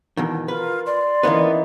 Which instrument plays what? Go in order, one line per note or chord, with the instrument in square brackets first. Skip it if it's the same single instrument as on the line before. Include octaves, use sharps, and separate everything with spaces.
[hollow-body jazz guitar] E2 B2 D#3
[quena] F4 [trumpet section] A#4 [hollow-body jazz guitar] B4
[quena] D5 [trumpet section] C6
[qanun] E3 C#4 D#4 [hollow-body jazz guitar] A#3 B3 B4